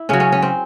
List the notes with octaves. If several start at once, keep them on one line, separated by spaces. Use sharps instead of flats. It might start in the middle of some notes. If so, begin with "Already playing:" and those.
Already playing: E4
C#3 F#3 C#4
C#4
C#4
C4